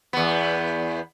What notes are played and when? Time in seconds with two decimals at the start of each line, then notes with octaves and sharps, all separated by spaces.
0.13 E2 B3